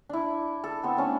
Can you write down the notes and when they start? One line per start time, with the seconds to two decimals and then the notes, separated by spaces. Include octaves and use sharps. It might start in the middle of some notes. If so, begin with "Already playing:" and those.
0.09 D4 E4
0.64 A4
0.84 B3 C4
0.97 A3 C#4 D4